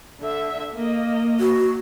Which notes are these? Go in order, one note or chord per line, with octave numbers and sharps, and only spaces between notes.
D3 E5
A#3 D#5
F#4